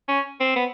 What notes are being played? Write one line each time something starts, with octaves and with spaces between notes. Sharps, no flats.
C#4
C4
B3